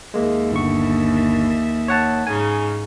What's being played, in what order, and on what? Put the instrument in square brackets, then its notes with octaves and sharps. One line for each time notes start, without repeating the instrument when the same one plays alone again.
[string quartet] D#2 E5 [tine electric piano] G#3 A#3
[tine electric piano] G1 D3 C#6
C#5 F#5 A5
[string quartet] G#2 C#3 D#4 [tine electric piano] G#5